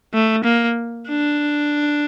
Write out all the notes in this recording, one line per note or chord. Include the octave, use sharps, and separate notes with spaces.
A3
A#3
D4